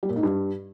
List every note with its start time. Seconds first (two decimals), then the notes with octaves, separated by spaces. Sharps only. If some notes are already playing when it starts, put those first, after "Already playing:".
0.03 G3
0.09 A#2
0.16 G#2
0.23 G2